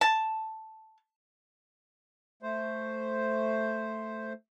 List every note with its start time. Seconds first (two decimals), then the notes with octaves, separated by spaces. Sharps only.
0.01 A5
2.42 A3 C5